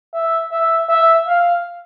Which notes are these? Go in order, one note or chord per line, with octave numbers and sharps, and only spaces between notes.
E5
E5
E5
F5